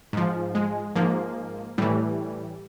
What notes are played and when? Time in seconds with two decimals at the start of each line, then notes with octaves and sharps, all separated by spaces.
0.13 G#2 F3
0.55 G#3
0.96 G#2 F3 A#3
1.78 A2 E3 G3